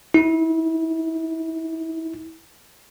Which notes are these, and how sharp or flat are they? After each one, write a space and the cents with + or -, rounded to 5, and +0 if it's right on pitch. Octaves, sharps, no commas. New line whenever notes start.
E4 -30